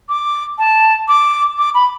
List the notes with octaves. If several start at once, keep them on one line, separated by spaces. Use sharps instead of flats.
D6
A5
D6
D6
B5